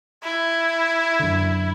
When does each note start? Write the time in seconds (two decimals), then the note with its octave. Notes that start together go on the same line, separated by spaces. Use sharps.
0.23 E4
1.20 F#2 D3